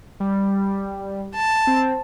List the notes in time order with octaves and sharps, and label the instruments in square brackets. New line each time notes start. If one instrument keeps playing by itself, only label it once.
[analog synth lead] G3
[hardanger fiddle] A5
[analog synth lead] C4